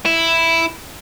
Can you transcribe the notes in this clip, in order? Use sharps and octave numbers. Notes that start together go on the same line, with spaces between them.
E4